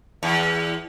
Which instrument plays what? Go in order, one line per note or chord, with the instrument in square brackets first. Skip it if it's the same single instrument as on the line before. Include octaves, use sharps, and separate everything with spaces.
[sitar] E2